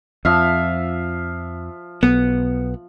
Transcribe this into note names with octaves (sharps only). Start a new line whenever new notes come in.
F2 F3 E5 F5
B1 B3